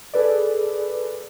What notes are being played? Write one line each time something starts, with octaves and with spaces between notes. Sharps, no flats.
G#4 A4 B4 D5